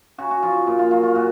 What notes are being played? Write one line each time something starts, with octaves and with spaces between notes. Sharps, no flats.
C#3 F#4
F#4
F3 F4
A#2 F4
F4
F#3 F4
F4
A#2 F#4